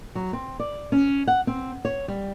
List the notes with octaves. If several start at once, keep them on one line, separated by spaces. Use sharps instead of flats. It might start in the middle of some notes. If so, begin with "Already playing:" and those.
F#3
C4
D5
C#4
F#5
C4
C#5
G3